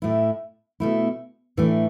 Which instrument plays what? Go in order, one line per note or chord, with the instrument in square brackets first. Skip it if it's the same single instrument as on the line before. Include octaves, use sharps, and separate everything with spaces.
[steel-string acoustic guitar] A2 A3 E4
B2 A3 E4
A2 E3 A3 D4